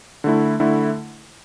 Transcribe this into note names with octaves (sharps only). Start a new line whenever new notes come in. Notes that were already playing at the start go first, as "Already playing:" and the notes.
D3 A3 E4
D3 A3 E4